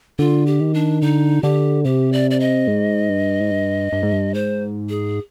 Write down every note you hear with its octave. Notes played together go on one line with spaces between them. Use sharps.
D3 F4
G4
D#3
D4
D3 D#4
D3 G4
C3 G4
D5
D5
D#5
G#2
G2
G#2
G2
G2
G#2
G2
G#2 C5
G#4